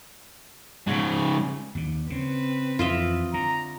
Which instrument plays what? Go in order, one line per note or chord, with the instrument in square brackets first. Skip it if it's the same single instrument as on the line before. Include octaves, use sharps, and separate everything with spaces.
[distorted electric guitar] G#2 C#3
[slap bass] D#2 D3
[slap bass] C#3 [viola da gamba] C4 B4
[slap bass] F2 E3 [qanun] F4 D#5 E5
[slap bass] D3 [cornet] A#5